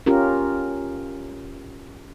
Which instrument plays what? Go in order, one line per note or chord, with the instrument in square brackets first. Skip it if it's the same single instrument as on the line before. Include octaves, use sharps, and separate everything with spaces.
[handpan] C#4 F4 G4 A#4